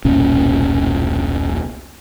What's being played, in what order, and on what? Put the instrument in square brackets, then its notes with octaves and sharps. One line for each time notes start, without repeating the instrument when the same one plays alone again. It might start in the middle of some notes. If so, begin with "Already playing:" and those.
[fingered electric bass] E1 C2 A#2 C#4